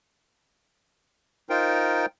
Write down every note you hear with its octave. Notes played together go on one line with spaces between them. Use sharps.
D#4 F4 A#4 C5 G5